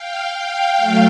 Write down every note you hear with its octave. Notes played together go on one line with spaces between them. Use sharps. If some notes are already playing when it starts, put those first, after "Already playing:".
Already playing: F5 G5
F5 G5
F#3 A3